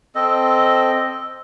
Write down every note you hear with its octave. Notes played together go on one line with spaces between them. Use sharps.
C4 A4 D#5